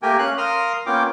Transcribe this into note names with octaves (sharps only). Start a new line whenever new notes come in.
A3 A#3 G4 A#4 G5 G#5
C#4 F5 F#6
A#4 F5 C6 D#6 F6
A#3 B3 C#4 F4 G5 D6